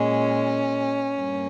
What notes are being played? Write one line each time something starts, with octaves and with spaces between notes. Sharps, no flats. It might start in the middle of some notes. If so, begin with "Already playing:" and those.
Already playing: A#2 G#3 C#4
G2 G3 A#3